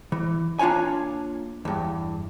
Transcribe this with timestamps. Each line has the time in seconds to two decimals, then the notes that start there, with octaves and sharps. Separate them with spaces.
0.12 E3
0.59 A#3 D4 F4 C#5 G#5
1.65 E2 G2